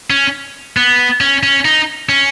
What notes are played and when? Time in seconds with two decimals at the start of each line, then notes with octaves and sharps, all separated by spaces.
0.10 C#4
0.77 B3
1.21 C#4
1.43 C#4
1.65 D#4
2.09 C#4